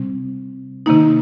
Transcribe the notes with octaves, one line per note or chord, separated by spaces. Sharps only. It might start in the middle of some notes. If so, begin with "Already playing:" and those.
Already playing: C3 G3 C4
C3 D#3 A#3 D#4